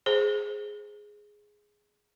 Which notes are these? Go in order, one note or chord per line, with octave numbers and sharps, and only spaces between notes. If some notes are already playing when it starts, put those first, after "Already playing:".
G#4 C5